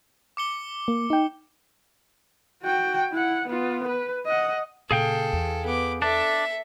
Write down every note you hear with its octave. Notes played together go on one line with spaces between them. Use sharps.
D6 C#7 G7
A#3
D#4 G5
F#4 G5
E4 F#5
B3 F4
B4
D#5 F#5
A#2 C#3 G#4 A4 F5 G5
E2
B3 D6
D4 A4 E5